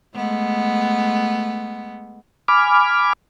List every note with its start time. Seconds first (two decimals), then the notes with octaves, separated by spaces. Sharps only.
0.15 G#3 A3 B3
2.48 G#5 B5 D6 F6